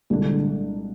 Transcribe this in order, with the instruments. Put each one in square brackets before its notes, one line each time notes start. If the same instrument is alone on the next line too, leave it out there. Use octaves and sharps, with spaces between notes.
[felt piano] C2 A#2 G#3 D4 [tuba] D3